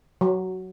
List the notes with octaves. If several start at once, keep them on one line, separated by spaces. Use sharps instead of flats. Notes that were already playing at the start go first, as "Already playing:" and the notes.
F#3